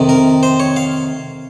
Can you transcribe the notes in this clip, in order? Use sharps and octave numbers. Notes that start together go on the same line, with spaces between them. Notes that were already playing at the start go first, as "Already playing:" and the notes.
Already playing: F2 C3 D#3
A#4
C5
C#5
F5